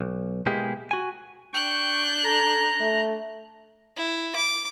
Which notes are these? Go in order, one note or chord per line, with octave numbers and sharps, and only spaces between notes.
B1
B2 G#3 A#3 E4 G4 G#4
F#4 G#5
D4 G5 C#6 F#6 G6
A4 A#5
A3
E4
D6